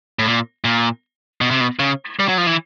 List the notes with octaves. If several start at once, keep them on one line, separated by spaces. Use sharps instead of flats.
A2
A#2
A#2
B2
C3
B2
C#3
G3
F#3
F3
E3